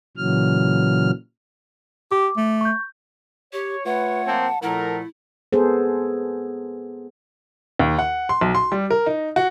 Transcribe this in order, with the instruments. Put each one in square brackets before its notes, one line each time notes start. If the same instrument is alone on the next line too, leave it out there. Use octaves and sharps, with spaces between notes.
[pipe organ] A#2 C#3 E3 F#3 F6
[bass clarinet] G4 [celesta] D6
[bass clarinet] A3
[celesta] C#6 G6
[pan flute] G4 [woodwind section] C#5
[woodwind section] A3 F4 C#5 [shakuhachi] B4 [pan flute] F#5
[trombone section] F3 A#3 C4 [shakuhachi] A5
[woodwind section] A#2 F3 A3 [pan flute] E4 [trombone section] A4 A#4 [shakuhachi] F#5
[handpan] B3 G#4 A4 C5
[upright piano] D#2
F#5
C6
B1
C6
G3
A#4
D#4
F#4